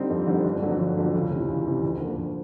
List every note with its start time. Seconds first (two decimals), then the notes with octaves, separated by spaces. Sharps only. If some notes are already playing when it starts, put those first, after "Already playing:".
Already playing: D3 G3 C4 D#4
0.10 F2
0.27 D3 G3 C4 D#4
0.45 G1
0.62 F2 D3 F#3
0.79 G1
0.97 F2 D3 F#3
1.14 C#2
1.31 C3 E3
1.48 C#2
1.66 C3 E3
1.83 D2
2.00 D3 F3 A#3
2.18 D2